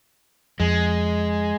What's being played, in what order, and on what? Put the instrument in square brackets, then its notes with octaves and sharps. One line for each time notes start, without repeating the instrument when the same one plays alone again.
[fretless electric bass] F2 [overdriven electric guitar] G#3